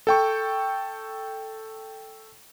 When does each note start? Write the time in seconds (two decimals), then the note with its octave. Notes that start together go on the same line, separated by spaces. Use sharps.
0.07 A4 G5 C#6